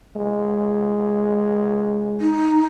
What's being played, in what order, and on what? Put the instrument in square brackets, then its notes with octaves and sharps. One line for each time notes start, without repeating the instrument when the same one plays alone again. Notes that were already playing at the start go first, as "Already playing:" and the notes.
[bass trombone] G#3
[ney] D#4